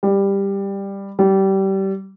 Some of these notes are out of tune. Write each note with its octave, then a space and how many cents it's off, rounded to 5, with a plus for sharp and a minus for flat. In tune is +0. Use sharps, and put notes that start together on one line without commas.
G3 +10
G3 -25